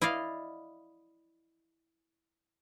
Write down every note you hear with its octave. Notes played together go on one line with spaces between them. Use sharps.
E4 D5 D#5 F5